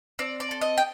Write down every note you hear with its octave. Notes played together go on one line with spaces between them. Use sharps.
C4 D5
D5
A4
D#5
G5